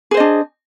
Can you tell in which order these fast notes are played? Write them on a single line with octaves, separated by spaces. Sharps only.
G#4 C5 D#5 D4